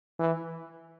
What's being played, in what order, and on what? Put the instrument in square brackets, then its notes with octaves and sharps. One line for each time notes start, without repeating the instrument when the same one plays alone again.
[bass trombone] E3